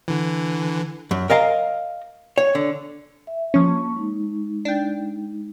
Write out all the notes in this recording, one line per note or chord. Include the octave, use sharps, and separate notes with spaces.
D3 E3
F#2
A#4 D#5 F5 A5 A#5
C#5
D3
E5
F3 A#3 C#4 A5 C#6
G#3 D#4
D4 G5